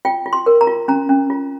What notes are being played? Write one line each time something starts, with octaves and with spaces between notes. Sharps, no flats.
F4 G5
F4
C6
A#4
A#5
F4
C#4 A#5
C#4
F4